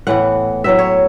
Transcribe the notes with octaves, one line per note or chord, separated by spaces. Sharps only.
A2 E3 B3 F#5
A2 F#3 B3 E5
C#5